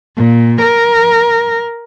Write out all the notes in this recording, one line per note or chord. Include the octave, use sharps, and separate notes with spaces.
A#2
A#4